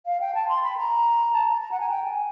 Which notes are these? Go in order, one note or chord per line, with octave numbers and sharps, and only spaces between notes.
F5
G5
A5
C6
B5
A#5
A5
A#5
A#5
F#5
G#5
G5
G#5